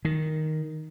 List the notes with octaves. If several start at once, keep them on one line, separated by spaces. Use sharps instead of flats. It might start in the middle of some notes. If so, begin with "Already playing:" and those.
D#3